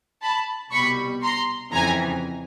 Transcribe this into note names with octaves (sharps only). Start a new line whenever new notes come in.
A5 B5
C2 B2 G3 B5 C#6
A#5 C6
F2 C#3 E3 G#5 A#5